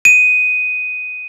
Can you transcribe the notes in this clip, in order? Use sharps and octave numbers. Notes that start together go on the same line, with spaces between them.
D#7